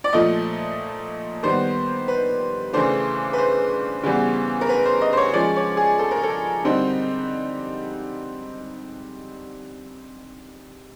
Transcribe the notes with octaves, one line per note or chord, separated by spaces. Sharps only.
D5
A#2 F3 A3 D#5
D#3 G3 B3 C5
B4
C#3 E3 A3 D4 C5
B4
C5
C#3 E3 G3 B3
A#4
B4
C5
D#5
C5
C#5
F3 G#3 C#4 D5
C#5
G#4
A4
A#4
A4
D3 G3 C4 D#4